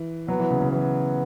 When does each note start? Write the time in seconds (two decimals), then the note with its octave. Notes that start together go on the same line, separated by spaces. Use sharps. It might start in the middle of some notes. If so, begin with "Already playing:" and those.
Already playing: E3
0.28 F#3 B3
0.40 E3
0.50 C#3
0.61 C#3
0.72 E3 B3